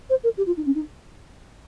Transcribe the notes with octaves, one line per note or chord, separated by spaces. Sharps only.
C5
A#4
G4
F4
D#4
C#4
D#4